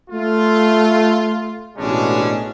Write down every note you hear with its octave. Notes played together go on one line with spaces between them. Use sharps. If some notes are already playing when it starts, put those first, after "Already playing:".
A3 F4
A1 B2 G#3 C#4 D4